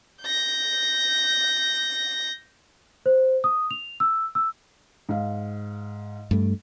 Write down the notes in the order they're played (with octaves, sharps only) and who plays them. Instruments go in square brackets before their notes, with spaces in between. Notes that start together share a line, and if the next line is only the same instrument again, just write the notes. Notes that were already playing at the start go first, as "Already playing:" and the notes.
[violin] G6 A#6
[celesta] C5
D#6
F7
E6
E6
[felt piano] G#2 F5
[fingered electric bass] G2 A3